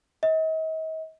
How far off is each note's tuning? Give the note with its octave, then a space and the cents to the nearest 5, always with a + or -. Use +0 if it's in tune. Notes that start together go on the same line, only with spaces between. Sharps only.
D#5 +40